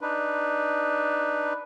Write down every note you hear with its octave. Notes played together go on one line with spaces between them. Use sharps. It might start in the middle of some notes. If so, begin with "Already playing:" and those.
D4 D#4 B4